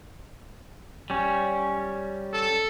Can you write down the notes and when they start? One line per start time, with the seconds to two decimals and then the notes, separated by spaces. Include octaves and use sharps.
1.10 G3 C#4
2.33 A4